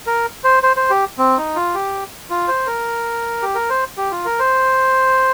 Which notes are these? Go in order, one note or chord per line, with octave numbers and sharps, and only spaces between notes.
A#4
C5
C5
C5
G4
C4
D#4
F4
G4
F4
C5
A#4
G4
A#4
C5
G4
F4
A#4
C5